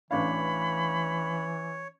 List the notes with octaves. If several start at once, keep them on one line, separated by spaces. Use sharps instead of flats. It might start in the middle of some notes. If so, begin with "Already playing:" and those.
A1 E3 D4 C#5 F5 B5